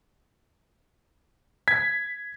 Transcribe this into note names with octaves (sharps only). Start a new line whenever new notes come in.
G#6 B6